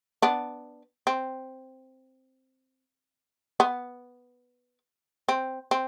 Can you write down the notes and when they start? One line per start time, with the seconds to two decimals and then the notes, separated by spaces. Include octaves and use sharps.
0.22 B3 D4
1.07 C4
3.60 B3
5.29 C4
5.71 C4